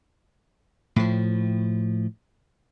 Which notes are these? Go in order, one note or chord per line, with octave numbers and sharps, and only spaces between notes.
A2 F3